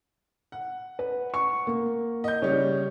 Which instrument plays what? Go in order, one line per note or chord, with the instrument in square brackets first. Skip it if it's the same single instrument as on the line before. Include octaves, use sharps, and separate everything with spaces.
[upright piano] F#5
[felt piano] B4
C#6
A#3
[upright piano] D#5 G6
[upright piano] C#3 G3 [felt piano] C#5